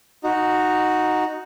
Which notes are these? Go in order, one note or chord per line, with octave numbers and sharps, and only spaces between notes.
D#4 F#4